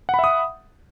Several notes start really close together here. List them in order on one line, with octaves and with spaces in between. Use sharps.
F#5 B5 E5 D#6